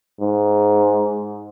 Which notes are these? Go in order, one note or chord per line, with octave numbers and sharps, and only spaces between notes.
G#2